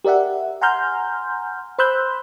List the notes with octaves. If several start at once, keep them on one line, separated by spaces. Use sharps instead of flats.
G4 A#4 D5 E5 F#5
F#5 G#5 A#5 C6 F6 G6
C5 B5 C6 E6 F#6 G6